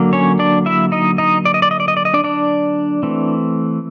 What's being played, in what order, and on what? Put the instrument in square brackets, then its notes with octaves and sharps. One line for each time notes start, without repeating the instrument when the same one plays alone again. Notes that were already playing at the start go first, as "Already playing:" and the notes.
Already playing: [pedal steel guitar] D3 F#3 A#3
C#4 C#5
D4 D5
E4 E5
D#4 D#5
D#4 D#5
D5
D#5
D5
D#5
D5
D#5
D5
D#5
D4 D5
D4 D5
E3 A3 C4